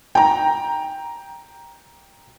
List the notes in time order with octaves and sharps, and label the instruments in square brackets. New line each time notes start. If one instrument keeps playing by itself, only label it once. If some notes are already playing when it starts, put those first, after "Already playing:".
[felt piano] G5 A#5